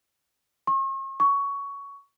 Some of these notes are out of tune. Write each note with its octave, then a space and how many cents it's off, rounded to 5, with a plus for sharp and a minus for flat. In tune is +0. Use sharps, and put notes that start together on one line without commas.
C#6 -45
C#6 +15